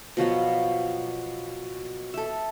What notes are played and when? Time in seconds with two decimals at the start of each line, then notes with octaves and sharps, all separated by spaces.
0.17 B2 F3 F#3 B3
2.14 A4 E5